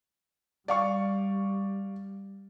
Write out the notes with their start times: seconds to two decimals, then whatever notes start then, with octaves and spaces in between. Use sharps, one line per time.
0.68 G3 D5 F5 C#6